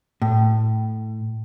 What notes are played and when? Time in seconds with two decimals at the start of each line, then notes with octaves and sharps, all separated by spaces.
0.22 A2